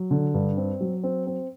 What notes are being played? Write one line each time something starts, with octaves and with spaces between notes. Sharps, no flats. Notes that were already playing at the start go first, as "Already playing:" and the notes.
Already playing: F#3
D3
G2
C4
F#3
C4
C4